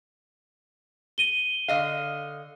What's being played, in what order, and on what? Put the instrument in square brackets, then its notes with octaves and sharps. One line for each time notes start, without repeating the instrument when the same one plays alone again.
[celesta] D#7 G7
[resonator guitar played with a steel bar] D3 D#5 F5